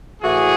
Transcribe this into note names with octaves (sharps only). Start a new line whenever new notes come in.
A2 E3 A3 F#4 G#4